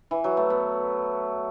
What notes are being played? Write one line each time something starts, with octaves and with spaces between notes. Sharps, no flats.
E3
F#3
A3
B3